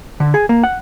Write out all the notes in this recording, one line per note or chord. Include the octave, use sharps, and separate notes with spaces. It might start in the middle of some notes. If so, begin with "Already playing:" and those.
D3
G#4
A#3
F#5